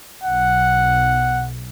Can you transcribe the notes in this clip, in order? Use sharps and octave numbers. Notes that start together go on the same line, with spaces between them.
B1 F#5